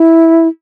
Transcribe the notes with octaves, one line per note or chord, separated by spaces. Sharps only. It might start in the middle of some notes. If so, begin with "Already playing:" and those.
Already playing: E4